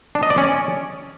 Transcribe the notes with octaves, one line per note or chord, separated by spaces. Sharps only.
D4
D#5
D5
C#4